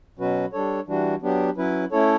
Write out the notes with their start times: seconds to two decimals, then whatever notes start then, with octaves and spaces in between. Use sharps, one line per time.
0.17 B2 F#3 C#4 F#4 B4
0.53 G3 D4 A4 C#5
0.87 E3 G3 D4 F#4
1.22 F#3 B3 D4 G4
1.56 F#3 C#4 E4 B4
1.92 A3 C#4 E4 A4 C#5